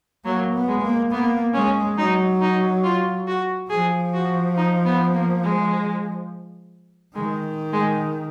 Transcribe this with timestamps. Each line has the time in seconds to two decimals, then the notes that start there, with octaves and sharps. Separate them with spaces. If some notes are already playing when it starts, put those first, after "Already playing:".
0.24 F#3 A#3
0.54 B3
0.68 G#3
0.82 A#3
1.11 A#3 B3
1.54 G#3 C#4
1.97 F#3 D#4
2.41 D#4
2.83 F4
3.27 F#4
3.70 F3 G#4
4.14 F#4
4.57 D#4
4.86 B3
5.14 A#3
5.43 G#3
7.15 D#3 G#3
7.73 G#3